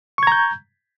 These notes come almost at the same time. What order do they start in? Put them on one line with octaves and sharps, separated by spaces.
C#6 G#6 A#5 G6